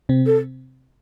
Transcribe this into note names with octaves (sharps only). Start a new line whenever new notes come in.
C3 C4
A4